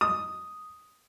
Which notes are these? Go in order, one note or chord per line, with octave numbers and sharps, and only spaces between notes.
D#6